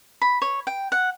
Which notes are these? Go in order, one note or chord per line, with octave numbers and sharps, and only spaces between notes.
B5
C#5
G5
F#5